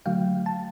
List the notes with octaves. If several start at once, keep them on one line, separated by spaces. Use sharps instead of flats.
D3 F#3 A3 F5 G5
A5